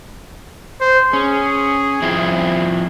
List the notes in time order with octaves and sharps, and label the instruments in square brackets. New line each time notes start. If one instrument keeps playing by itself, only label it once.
[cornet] C5
[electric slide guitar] C#4 [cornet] G#4
[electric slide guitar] F3 C4 E4